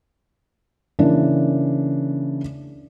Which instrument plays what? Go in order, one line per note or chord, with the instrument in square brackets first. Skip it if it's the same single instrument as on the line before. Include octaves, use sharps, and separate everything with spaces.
[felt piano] C#3 E3 A#3 D4